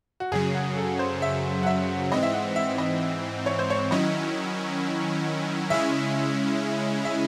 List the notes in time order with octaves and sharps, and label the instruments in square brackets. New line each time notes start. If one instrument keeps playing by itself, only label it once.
[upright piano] F#4
[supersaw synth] F#2 C#3 F#3 [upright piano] G#4
[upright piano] F#5
A4
C5
E5
F#5
E5
[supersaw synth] G#2 E3 C4 [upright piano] D#5
[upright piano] E5
F#5
E5
D#5
C#5
C5
C#5
[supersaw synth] D#3 F#3 C#4 E4 [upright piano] D#5
[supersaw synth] C#3 G#3 C#4 E4 [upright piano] E5
[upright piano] E5